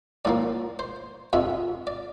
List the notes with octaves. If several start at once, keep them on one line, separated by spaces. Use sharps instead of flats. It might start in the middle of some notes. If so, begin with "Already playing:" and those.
A2 F3 A#3 D5
C5
F2 C3 F3 E5
D5